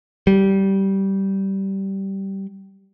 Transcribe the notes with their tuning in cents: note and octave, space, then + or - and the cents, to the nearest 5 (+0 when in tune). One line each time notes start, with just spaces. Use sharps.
G3 -15